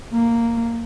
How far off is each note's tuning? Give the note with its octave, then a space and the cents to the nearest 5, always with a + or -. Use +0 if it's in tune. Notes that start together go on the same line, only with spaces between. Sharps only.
A#3 -5